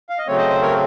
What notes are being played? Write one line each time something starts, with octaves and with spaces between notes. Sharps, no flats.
F5
D#5
C#3 F#3 A3 C4 C#5
C5 D#5
C5
A#4 C#5